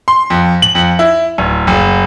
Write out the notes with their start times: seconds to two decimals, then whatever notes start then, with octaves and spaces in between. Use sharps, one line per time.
0.08 C6
0.30 F2
0.62 F#7
0.75 F2
0.99 E4
1.38 D1
1.67 F#1